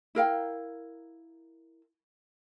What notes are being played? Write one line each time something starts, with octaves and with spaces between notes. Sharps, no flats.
E4 A#4 F5 G5